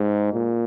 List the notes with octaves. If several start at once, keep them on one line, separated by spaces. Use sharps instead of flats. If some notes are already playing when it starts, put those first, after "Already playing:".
Already playing: G#2
A#2